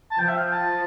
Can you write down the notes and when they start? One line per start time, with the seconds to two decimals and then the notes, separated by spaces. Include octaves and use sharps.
0.11 A5
0.18 F3 G5
0.28 E5
0.37 F5
0.45 G5
0.52 A5